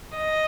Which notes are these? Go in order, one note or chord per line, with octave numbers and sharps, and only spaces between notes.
D#5